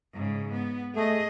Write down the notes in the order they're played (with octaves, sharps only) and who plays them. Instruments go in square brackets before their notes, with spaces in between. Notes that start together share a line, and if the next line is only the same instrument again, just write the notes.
[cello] G#2 C#3
B3
[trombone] A3 [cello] G#4 D#5